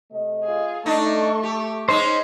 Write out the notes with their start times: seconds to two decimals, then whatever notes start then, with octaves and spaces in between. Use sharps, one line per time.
0.11 C3 A3 D#5
0.44 F4 G#4
0.86 A3 D4 D#4 A4 C#6
1.43 G4
1.89 G#3 C#4 D#4 C5